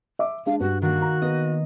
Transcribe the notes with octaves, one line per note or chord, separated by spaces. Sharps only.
E5 D6
G#3 D4 F5
G2 F#4
D#3 A#3 F#4
A#5
B3 D#5